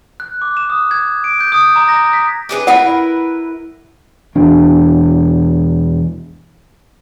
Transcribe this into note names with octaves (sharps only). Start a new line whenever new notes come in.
F#6
D6
E7
D#6
G#6
D7
G6
D#6
A#5
A#6
B6
D4 G#4 B4
E4 A#4 B4 F#5
E1 E2 D4